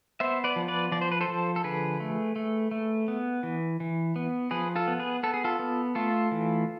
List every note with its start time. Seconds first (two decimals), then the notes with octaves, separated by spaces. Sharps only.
0.20 B3 C5 E5
0.44 B4 D5
0.56 F3
0.68 B4 D5
0.92 F3 D5
1.02 C5
1.12 B4
1.21 A4 C5
1.28 F3
1.56 A4
1.64 D3 G#4 B4
2.00 A3
2.36 A3
2.71 A3
3.08 B3
3.43 E3
3.80 E3
4.16 B3
4.51 F3 G#4 B4
4.76 F4 A4
4.87 B3
4.99 G#4 B4
5.23 B3 A4
5.34 G#4
5.44 F4 A4
5.59 B3
5.95 A3 F4 A4
6.31 E3